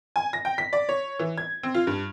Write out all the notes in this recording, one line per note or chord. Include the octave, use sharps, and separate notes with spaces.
G#5
A#6
G5
B6
D5
C#5
E3
G#6
C4
F4
G2